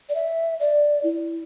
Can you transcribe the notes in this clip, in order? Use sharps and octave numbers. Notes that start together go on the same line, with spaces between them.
D5
E5
D5
E4